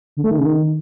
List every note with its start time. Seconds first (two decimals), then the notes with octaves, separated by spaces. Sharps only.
0.17 D3
0.24 A3
0.31 D#3
0.38 C#3
0.46 D#3